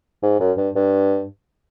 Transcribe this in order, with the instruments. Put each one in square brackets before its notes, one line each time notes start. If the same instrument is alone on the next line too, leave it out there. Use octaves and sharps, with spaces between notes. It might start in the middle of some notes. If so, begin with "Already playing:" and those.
[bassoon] G#2
F#2
G2
G2